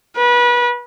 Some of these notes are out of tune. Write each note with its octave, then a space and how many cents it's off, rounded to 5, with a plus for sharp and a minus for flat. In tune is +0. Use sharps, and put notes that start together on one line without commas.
B4 -30